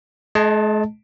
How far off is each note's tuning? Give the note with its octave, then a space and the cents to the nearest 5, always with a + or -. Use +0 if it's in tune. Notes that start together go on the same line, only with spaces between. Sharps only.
G#3 +45 D#5 +0 A5 +0